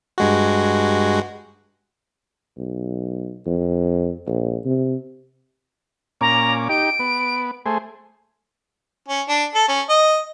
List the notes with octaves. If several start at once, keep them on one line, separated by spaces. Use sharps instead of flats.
G2 G#3 F#4
B1
F2
A#1
C3
A#2 C#4 A#5 D6
D#4 G4 D7
B3
A3 G#4 C5
C#4
D4
A4
C#4
D#5